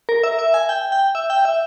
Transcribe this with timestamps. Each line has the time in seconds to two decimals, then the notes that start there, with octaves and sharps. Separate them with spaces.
0.09 A#4
0.23 E5
0.39 E5
0.54 G#5
0.69 G5
0.92 G5
1.15 E5
1.30 G5
1.45 E5